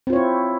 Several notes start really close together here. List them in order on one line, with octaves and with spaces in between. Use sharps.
C4 F4 C#5 E4